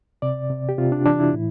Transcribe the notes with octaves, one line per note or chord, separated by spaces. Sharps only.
C3 D5
C3
G4
C3 F4
D4
E3 D4
E4
A2